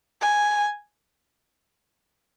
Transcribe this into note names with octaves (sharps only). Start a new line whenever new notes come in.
G#5